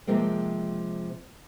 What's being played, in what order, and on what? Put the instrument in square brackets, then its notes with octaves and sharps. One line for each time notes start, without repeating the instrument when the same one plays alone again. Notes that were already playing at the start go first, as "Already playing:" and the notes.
[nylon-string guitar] C3 F3 G#3 A#3 C4